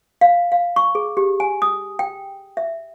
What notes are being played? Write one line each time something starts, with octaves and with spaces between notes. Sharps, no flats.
F5
F5
C#6
G#4
G4
G#5
D#6
G5
E5